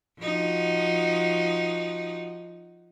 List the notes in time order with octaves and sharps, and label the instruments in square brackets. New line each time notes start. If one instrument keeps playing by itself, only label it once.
[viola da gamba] F3 D#4 F#4